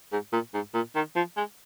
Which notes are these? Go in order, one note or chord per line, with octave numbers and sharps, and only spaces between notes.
G#2
A#2
G#2
A#2
D#3
F3
G#3